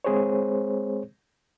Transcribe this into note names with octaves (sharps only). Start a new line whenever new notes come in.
G#3 C4 G#4 C5 C#5